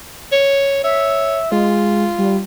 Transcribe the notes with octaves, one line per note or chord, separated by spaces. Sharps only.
C#5
C#5 E5
G#3 F4
G3